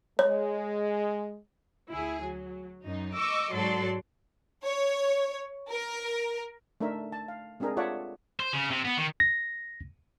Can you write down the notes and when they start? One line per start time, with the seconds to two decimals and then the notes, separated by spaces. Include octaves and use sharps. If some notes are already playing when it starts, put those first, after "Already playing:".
0.19 G#3 C#5
1.90 D2 E4 G#4
2.23 F#3
2.85 F#2 D#4
3.16 D#5 C#6 D6 E6
3.54 G#2 F#3 A4 D5 C6
4.65 C#5
5.71 A#4
6.81 A3 D4 D#4 A#4 E5
7.12 A5
7.28 F5
7.60 G#3 C4 D4 G#4 A#4
7.77 F4 A4 C#5 D5 E5 F#5
8.40 C5
8.53 C#3
8.70 C3
8.85 B3
8.97 D#3
9.20 A#6